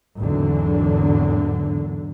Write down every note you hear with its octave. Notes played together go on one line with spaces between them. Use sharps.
G#1 E2 D3 F#3